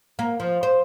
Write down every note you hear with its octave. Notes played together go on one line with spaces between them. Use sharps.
A#3
F3
C5